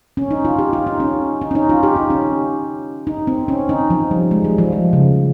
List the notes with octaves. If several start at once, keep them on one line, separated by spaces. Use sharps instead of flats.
C#4
D#4
F4
G4
F4
D#4
C#4
D#4
C#4
D#4
F4
G4
D#4
C#4
D#4
C4
C#4
D#4
F3
G3
G#3
G3
F3
F3
C#3